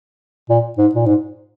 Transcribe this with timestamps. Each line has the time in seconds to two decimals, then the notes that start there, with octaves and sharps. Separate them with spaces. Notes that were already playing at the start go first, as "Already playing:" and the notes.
0.49 A#2
0.78 G#2
0.95 A#2
1.06 G#2